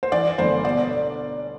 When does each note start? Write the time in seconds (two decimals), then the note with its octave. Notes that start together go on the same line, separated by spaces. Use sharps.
0.03 C5
0.12 E3 D5
0.38 G1 C5
0.65 B2 D5